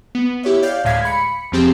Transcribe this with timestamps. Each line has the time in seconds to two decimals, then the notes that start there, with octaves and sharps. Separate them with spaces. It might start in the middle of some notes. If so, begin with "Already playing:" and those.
0.15 B3
0.43 E4 G4 C#5 E5
0.63 C#5 D5 F5 G6
0.84 D2 A2 G#3 F5 G#6 B6
1.05 B5 C#7
1.52 F2 F3 C4 G4 G#4